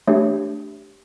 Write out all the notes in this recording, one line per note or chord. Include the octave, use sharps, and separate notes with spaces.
A3 D4 G4 C#5